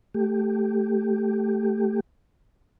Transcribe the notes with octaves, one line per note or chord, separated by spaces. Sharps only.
A3 G4